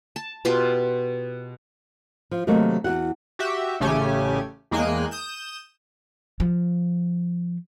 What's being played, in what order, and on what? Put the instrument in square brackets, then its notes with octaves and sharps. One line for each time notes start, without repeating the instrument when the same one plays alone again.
[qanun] A5
B2 F4 G4 C6
[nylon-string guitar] F3
C3 D#3 F#3 A3 A#3 D#4
E2 G#2 F#4 F#5
[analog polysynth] F#4 G4 E5
A1 C#3 A3 C#4 G4 G#5
E2 G#3 A#3 G5 G#5 F#6
D#6 G6 E7
[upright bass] F3